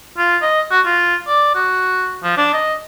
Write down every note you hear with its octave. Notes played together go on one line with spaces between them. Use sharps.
F4
D#5
F#4
F4
D5
F#4
F3
D4
D#5